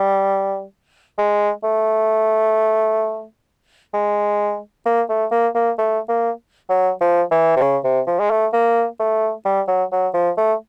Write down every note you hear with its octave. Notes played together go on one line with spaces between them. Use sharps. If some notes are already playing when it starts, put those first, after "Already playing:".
Already playing: G3
G#3
A3
G#3
A#3
A3
A#3
A#3
A3
A#3
F#3
F3
E3
C3
C#3
C3
F3
G#3
A3
A#3
A3
G3
F#3
F#3
F3
A3